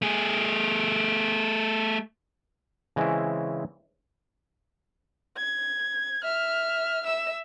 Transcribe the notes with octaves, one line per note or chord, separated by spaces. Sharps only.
A3 G#4
C#3 E3 G#3 C4 C#4 E4
G#6
E5 F6
E5 E6